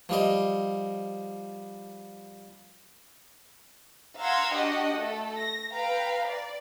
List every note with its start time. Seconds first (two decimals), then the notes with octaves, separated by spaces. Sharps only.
0.09 F3 G3 D#5
4.17 F5 F#5 A#5 C6 E6 G#6
4.52 D4 F#4 G4 D#5 F#5 G5
4.95 A3 A4
5.37 A#6
5.72 B4 F5 G5 A#5
6.29 D5